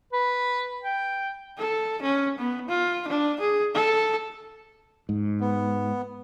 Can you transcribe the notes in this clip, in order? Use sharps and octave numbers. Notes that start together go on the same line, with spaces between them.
B4
G5
A4
C#4
B3
F4
D4
G#4
A4
G#2
B3